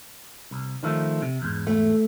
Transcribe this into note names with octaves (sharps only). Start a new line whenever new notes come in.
C2
D#3 F3 A3
C3
E2 G#2
A3